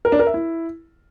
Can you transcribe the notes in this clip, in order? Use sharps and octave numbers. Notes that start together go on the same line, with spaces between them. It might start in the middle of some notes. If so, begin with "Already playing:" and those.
A#4
D4
A#4
E5
E4